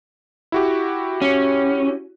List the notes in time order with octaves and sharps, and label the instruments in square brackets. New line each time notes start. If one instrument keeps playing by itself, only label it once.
[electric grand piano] E4 F#4 G4
[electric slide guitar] C#4